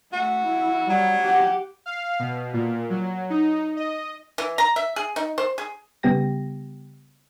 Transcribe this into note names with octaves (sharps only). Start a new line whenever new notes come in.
A3 F#4
E4
F#3 G3
G4 F#5
F5
B2
A#2
F#3
D#4
D#5
E3
A#5
E5
G#4
D#4
C5
G#4
C#3 G3 B3 G4 G5 A#6